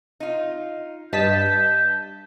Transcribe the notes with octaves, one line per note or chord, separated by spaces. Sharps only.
D#4 F4
G2 D#5 A5 G6 B6